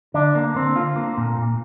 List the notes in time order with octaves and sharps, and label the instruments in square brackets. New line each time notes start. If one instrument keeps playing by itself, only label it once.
[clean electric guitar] D3 D4
D3 A#3
D3 C4
D3 F4
A#3
A#2
A#2